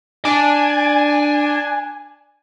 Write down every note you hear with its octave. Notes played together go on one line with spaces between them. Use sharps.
D4 G#5